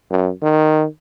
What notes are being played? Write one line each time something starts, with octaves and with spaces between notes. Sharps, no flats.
F#2
D#3